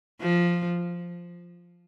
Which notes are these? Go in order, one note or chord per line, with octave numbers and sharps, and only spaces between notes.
F3